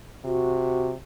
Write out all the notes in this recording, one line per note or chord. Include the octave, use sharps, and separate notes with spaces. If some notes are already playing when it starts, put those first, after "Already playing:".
C3 F#4